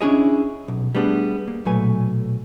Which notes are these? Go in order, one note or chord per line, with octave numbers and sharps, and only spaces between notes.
C#4 D4 E4 G#4 C#5 D#5
B1
G3 A3 B3 D4 G#4
A#3
B1 A#2 F#3 A3 B4 G#5